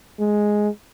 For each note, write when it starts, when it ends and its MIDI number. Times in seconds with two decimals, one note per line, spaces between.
0.20 0.69 56